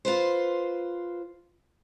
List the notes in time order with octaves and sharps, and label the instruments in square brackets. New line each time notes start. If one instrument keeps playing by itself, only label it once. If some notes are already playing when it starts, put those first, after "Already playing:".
[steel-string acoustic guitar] F4 B4 C5